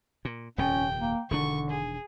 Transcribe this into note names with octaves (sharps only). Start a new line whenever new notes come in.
A#2
D#1 F2 C3 C#4 G5
A#3
E1 D3 D#3 D4 C#6
G#4